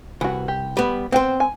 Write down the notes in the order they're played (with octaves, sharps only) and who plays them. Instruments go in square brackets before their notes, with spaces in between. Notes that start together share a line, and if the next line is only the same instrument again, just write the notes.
[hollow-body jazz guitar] C2 [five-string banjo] E3 F#4
[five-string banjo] G4
[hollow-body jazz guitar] G3 B3
[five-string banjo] B3 G5 [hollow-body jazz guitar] C4 C5
[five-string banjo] G#5